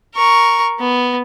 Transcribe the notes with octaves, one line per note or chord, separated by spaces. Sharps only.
A#4 C#6
B3